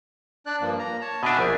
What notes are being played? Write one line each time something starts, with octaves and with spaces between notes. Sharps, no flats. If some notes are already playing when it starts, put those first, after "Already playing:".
D4 D5 F#6
G2 F3 A#3
A#3 A#5
C#5 A5
B2 D4 E5 G#5
A#1